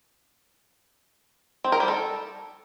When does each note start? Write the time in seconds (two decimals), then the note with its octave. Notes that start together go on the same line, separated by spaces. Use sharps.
1.64 C4
1.72 A#4
1.80 G3
1.88 A4